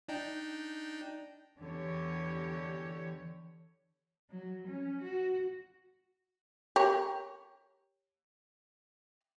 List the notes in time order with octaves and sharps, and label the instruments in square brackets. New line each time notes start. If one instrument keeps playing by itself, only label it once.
[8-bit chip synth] D4 D#4 G5
[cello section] E2 D3 E3 G4 C#5
[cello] F#3
C#4
F#4
[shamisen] G4 A#4 C#5